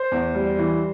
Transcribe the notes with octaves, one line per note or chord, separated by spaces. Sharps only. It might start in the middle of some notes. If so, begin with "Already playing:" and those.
Already playing: C5
E2
G3
E3